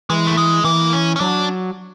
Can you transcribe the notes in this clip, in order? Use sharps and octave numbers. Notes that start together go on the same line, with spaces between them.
E3 G#3
A3
G#3
E3 A#3
C#4
C#4
F#3 D4